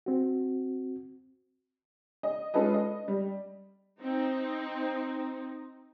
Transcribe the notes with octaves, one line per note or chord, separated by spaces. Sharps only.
C4 F#4
D#5
G#3 C#4 F4 A4 B4 D#5
D#5
G3
C4 D#4